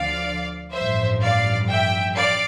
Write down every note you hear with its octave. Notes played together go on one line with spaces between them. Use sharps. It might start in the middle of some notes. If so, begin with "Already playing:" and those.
Already playing: D2 D3 F3 D5 F5
A1 G2 F3 C5 E5
D5 F5
E5 G5
D5 F5